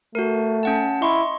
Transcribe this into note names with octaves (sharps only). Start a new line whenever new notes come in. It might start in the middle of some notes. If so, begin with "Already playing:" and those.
A3 F#4 A#4
C#4 F#5 A5
E4 D#5 C6 C#6